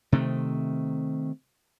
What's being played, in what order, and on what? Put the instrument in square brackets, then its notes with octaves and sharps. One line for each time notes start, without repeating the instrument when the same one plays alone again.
[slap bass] C3 D#3 A3